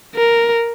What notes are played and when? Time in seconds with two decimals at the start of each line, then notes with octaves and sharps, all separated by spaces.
0.15 A#4